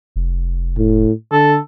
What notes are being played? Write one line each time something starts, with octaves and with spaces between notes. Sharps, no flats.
F1
A2
D3 A4